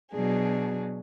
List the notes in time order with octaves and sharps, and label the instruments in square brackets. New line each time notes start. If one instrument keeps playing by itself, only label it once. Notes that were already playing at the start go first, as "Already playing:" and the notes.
[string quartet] B2 F#3 D4 G#4